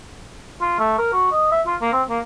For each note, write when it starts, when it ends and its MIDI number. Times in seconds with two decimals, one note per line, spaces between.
0.61 0.78 65
0.79 0.97 57
0.98 1.11 70
1.13 1.31 66
1.32 1.49 75
1.52 1.62 76
1.67 1.76 65
1.81 1.88 58
1.93 2.03 60
2.09 2.20 58